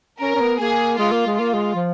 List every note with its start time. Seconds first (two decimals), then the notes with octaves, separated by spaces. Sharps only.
0.21 C#4 A#4
0.35 C#4
0.40 B3
0.59 A#3 G#4
0.98 G#3 F4
1.12 A#3
1.26 G#3
1.37 A#3 F4
1.54 G#3
1.75 F3